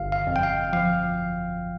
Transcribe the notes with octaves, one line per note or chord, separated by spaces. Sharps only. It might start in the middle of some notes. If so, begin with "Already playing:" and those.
Already playing: G1 F5
F5
F2
G5
F5
F3 F5